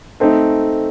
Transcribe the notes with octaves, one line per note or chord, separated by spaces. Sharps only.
A3 C4 D#4